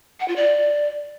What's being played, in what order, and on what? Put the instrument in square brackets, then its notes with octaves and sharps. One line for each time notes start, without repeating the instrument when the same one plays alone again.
[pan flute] F#5
F4
D5